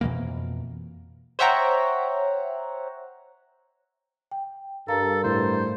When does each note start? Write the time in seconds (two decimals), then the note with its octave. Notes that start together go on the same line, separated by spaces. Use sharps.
0.01 F2 B2 E3 A#3
1.39 C5 C#5 E5 F#5 G5 A#5
4.31 G5
4.88 G2 A4 A#4 F5 A#5
5.24 A2 C5